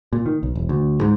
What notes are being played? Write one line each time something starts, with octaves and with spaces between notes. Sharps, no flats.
A#2
D#3
B1
E1
D2
G#2